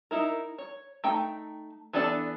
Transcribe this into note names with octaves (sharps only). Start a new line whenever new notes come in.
D#4 E4 A#4
C#5
A3 D#4 G5
E3 B3 D4 A4 D5